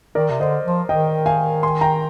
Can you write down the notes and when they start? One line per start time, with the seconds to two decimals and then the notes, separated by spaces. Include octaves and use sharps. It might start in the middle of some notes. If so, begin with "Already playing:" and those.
0.15 D#3 A#4 D5
0.30 C3
0.40 D3 C5 D#5
0.65 F3
0.89 D#3 D#5 G5
1.26 F5 G#5
1.63 G#5 C6
1.81 G5 A#5